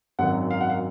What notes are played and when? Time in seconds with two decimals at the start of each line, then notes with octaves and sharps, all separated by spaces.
0.19 G#1 F#2 D#3 F#3 F#5
0.51 F5
0.61 F#5
0.70 F5